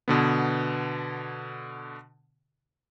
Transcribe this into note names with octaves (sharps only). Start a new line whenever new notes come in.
B2 D3 B3